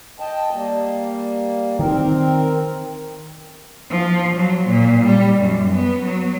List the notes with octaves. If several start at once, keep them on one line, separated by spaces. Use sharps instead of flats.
D#5 G5 A5
G3 A#3
D#3 C4 A#4
F3
F#3
A#2
G3
F#2
B3
F#3